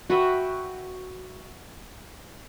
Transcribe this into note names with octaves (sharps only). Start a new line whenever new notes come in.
F#4 B4 E5 G5